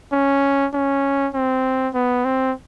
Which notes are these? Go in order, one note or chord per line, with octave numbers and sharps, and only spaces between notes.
C#4
C#4
C4
B3
C4